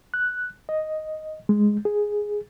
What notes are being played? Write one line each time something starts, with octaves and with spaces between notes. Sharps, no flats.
F#6
D#5
G#3
G#4